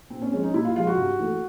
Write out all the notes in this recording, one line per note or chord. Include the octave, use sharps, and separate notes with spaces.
A#2 C4
C#4
F3 G#3 C#4
D#4
A#2 E4
F4
F3 G#3 F4
F#4
G2
E3 A3